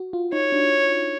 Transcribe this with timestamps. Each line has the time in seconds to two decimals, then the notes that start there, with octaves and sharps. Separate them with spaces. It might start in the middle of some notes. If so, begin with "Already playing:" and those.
Already playing: F#4
0.13 F4
0.33 D#4 C#5
0.52 D4